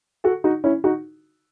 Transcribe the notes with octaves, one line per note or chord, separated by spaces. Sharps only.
F#4 A4
D#4 F#4
C#4 E4
D#4 F#4